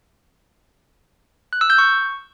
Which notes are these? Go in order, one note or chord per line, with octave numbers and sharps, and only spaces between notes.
F#6
E6
G6
C#6